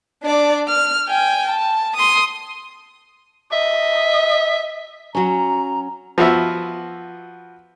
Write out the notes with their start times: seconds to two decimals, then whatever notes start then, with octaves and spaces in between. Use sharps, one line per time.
0.23 D4 D5
0.68 F6
1.08 G5 G#5
1.49 A5
1.96 C6 D#6
3.52 D#5 E5
5.15 F#3 C#4 A#5
6.18 F3 B3 F#4 E5